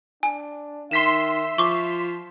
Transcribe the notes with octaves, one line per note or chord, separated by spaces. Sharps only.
D4 G#5
D#3 E5 C6 B6 E7
F3 C#6 D6